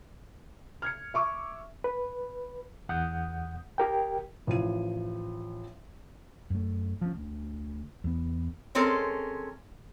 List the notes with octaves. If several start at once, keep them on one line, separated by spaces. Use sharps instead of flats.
F6 G#6 C#7
E5 C#6 D6
B4
E2 F#5 D#6 G6
G4 A#4 G5
A1 F3 D#7
F#2 A3
F3 C#4
D2
E2 B3
G#3 C4 C#4 A4 A#4